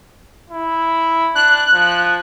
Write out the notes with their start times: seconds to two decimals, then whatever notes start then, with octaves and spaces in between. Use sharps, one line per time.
0.50 E4
1.35 D4 F#6
1.73 F3